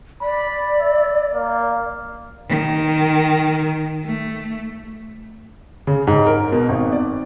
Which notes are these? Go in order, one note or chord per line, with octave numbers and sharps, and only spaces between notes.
D5 B5
E5
A#3
D#3
A3
C#3
G#2
A#4
B2
G#1
D5